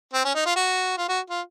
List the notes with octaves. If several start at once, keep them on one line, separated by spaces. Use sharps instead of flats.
C4
C#4
D#4
F4
F#4
F4
F#4
F4